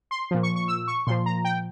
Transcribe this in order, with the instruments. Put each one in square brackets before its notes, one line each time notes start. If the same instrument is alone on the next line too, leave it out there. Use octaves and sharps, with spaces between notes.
[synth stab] C6
A#2 F3
C#6
C#6
E6
C#6
A#2 F3 C6
A#5
G5